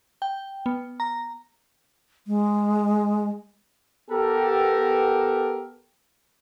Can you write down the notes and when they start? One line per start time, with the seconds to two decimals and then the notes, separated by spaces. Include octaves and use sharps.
0.22 G5
0.66 B3
1.00 A#5
2.27 G#3
4.10 B3 G4 A4 A#4